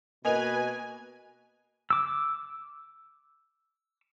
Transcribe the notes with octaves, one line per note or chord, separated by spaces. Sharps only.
B2 A#3 B4 D#5 G#5 F7
D6 E6